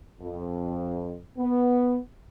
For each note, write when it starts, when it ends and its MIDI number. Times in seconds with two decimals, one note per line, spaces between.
0.20 1.18 41
1.37 1.97 59